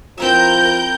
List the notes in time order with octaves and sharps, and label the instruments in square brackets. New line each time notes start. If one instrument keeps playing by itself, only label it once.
[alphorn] F3 [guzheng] C4 E4 E5 [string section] A#4 G6